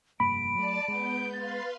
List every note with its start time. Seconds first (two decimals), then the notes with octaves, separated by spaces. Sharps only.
0.20 F1 G2 A#3 B5 D7
0.55 F#3 A3 D5 A5
0.88 G#3 B3 G6
1.33 B4 F5 C6 A6